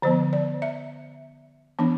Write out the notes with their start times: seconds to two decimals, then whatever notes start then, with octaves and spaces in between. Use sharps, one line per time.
0.02 D3 F3 B3 C5
0.33 D5
0.62 E5
1.79 E3 B3 D4